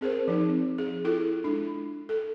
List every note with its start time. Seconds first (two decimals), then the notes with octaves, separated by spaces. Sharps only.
0.01 C4 G#4 A#4 C5
0.28 F3 C4 D#4
0.78 G#4
1.05 E4 F4 A4
1.44 G#3 D4
2.09 A4